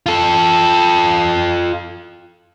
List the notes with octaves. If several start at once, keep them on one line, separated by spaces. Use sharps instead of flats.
F4 A4